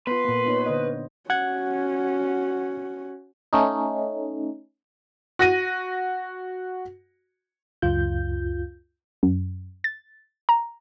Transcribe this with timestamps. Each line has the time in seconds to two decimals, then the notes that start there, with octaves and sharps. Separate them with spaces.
0.07 B3 F4 B4 C6
0.25 A#2 A#3
0.46 B3 D#4 C#5
0.66 D3 C5 D#5
1.30 C#4 F#4 F#5 G#6
3.53 A3 C#4 D#4
5.39 F#4 A#6 D#7
7.82 C#2 F#2 F4 G6
9.23 F#2
9.84 A6
10.49 A#5